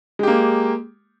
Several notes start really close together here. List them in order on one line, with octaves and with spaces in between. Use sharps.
G#3 G4 A#3